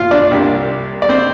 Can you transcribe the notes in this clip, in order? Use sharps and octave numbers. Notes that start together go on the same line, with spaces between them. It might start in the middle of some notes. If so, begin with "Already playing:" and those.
Already playing: F4 F5
D4 D5
C2 C3 A#3
D5
C4 C5